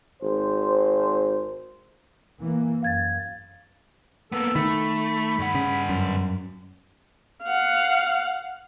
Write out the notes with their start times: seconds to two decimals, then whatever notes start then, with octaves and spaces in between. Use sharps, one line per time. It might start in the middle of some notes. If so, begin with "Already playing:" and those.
0.23 G#1 C5
2.39 E3 A#3
2.83 F#2 F5 G#6 A6
4.32 A#3 B3 A4
4.56 D#3 A3 B5
5.39 G2 F#5
5.55 C#3
5.89 F#2
7.44 F5 F#5